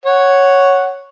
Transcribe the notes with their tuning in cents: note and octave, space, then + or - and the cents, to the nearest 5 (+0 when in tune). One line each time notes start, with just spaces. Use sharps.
C#5 +0 F#5 +0